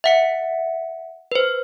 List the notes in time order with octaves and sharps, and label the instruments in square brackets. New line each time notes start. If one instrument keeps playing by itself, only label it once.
[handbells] E5 F#5 C#7
B4 C5